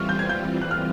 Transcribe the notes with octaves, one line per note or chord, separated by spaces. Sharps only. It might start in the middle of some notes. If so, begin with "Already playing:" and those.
Already playing: E3 G3 C4 F4 C#6 F6
G6
G#6
G6
F#6
F6